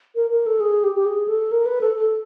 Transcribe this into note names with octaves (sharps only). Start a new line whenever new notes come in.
A#4
A#4
A4
G#4
G4
G4
G#4
A4
A#4
B4
A4
A4